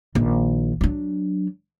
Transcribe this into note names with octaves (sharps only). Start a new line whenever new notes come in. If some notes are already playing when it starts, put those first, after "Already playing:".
A#1 D#3
F#3 D4